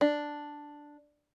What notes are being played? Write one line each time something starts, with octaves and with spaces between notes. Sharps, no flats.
D4